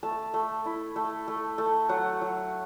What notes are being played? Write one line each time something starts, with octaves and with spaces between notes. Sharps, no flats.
A3 A5
A3
E4
A3
A3
A3
F#3 F#5
F#3